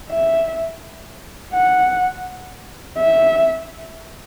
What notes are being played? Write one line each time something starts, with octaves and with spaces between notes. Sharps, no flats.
E5
F#5
E5